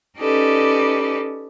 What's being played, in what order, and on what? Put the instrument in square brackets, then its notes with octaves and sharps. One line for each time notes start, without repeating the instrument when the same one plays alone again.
[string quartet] C#4 D#4 G4 A4 B4 D5